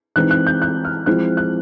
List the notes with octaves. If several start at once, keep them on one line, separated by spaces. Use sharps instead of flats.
E3 G#3 C4 D#4 F#6
F#6
G6
F#6
F6
F3 G#3 C4 E4 F#6
F#6